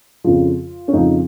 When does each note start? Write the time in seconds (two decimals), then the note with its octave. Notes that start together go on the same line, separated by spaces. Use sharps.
0.24 F2 C#3 F3 F4
0.88 C#4
0.93 F2 C#3 F3 D#4